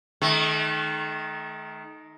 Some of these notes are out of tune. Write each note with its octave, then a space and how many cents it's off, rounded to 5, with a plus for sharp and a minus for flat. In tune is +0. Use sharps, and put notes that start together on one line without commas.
D#3 +0 A3 -40